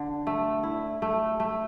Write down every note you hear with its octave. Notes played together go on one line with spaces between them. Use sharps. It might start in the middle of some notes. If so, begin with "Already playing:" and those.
Already playing: D3
A3
E4
A3
A3